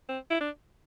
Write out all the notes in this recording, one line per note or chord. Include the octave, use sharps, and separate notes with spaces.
C4
E4
D4